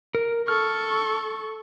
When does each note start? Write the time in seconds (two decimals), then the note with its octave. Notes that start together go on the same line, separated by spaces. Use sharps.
0.15 A#4
0.48 A4 C#6 F6